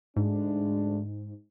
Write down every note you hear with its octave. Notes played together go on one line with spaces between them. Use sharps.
D2 G#2 G#3 D4